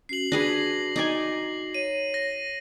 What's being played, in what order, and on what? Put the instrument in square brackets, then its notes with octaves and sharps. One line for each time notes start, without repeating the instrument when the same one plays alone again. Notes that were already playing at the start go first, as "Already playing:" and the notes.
[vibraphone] C#4 F#4 [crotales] C7 F#7
[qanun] D4 G#4 B4 [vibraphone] F#4 [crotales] A#6
[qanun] D#4 D5 G#5
[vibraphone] C#5 [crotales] D#7
[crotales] A#6